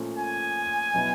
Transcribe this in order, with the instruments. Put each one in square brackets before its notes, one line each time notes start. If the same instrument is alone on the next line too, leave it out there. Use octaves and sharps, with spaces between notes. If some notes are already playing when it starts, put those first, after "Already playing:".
Already playing: [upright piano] A#2 F3 A3 C#4
[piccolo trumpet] G#5
[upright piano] B2 F#3 B3 E4